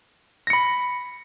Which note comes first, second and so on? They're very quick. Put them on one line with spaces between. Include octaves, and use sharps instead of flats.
A#6 C#7 B5